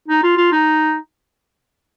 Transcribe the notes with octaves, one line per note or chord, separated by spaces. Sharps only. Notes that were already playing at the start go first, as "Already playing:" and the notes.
D#4
F4
F4
D#4